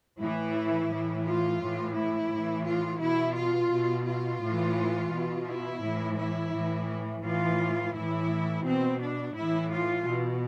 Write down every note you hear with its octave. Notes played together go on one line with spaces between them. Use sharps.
A2 E3 E4
A2 E3
F4
A2 E3
E4
A2 E3
F4
B2 E4
F4
B2
F4
A2 E3
B2
E4
A2 E3
E4
A2 E3
A2 E3 F4
A2 E3 E4
B2 C4
D4
A2 E3 E4
F4
B2